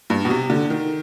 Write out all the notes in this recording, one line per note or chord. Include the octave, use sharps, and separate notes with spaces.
G2
B2
C3
D3
D#3